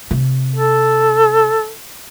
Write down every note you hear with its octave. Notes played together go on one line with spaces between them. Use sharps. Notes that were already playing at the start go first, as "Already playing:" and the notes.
C3
A4